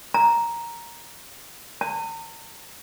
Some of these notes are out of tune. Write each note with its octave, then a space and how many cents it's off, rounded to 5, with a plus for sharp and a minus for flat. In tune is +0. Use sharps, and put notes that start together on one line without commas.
A#5 +5
A#5 -40